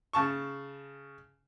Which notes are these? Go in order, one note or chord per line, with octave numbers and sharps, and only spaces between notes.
C#3 A5 C#6